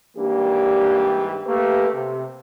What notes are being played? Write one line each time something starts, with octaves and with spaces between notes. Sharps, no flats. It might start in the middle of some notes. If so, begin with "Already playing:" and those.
G#2 E3 G3 A#3 D4 G4
A3 A#3 G4 B4
C3